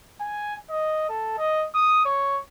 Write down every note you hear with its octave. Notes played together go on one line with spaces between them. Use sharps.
G#5
D#5
A4
D#5
D#6
C#5